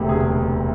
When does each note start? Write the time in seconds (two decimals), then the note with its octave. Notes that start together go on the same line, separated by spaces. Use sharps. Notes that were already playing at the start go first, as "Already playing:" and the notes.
Already playing: E1 D2 C3
0.09 G#4